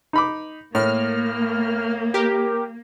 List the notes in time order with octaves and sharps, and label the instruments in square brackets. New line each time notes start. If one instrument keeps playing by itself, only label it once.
[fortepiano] D#4 B5 D6
[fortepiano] A2 [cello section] A#3 [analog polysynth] F6
[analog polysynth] G4 A#4